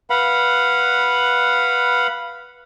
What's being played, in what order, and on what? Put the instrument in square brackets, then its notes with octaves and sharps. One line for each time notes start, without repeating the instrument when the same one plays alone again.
[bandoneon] B4 F5 F#5 B5